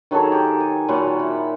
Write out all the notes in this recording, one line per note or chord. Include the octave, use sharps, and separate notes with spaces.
D#3 F#3 G#4 A4
G4
G#5
A#2 F#3 B5 C6
E4